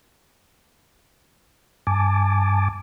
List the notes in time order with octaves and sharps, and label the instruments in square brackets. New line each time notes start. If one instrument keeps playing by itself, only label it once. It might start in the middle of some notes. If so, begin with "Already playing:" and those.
[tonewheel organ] G2 G#5 A5 D6